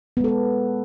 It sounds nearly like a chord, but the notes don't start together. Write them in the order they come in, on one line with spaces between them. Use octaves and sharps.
B3 G#3 A4 B4